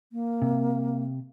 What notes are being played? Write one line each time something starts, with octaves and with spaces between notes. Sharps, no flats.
A#3
C3